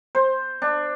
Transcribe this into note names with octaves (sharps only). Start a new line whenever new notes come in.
C5
D4